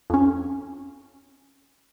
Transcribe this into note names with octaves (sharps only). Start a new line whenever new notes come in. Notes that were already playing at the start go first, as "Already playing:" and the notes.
F2 C#4